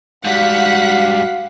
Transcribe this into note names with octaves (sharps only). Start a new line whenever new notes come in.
G#2 G3 F#4 F5 F#5 B6